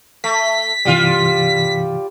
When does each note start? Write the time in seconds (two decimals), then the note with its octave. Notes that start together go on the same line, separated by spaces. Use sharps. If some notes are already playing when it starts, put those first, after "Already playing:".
0.24 A3 B6
0.85 G2 C3 E3 G3 F4